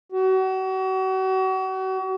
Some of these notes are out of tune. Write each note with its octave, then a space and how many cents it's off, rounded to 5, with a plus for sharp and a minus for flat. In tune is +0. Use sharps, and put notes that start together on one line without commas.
F#4 +35